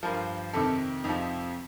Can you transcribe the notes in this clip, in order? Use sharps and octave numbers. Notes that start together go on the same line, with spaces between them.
G2 F3 A#4
F2 C3 D#3 A4
F2 C3 F3 D#4